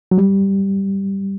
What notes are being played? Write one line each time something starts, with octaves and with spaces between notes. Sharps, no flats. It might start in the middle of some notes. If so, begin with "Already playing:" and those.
F#3
G3